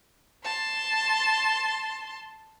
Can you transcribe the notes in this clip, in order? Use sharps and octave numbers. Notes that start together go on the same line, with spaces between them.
A5 C6